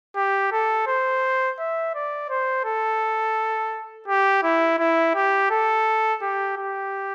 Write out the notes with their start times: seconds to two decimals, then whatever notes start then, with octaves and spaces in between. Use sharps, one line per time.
0.16 G4
0.52 A4
0.87 C5
1.59 E5
1.95 D5
2.30 C5
2.65 A4
4.08 G4
4.43 E4
4.79 E4
5.15 G4
5.51 A4
6.22 G4
6.57 G4